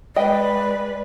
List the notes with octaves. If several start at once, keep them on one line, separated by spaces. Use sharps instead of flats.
G#3 B4 D5 D#5 G5